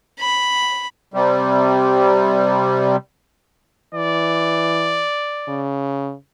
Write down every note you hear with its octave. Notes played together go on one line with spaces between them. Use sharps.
B5
C3 G3
E3 D5
C#3